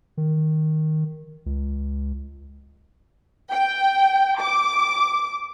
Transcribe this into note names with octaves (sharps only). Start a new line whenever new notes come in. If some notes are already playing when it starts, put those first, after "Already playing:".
D#3
C#2
G5
D6